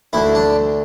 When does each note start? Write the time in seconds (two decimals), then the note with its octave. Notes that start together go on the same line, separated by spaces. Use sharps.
0.13 D2 D3 E4
0.35 D4